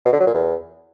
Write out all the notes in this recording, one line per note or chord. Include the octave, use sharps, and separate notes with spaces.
B2
D3
F#3
A#2
E2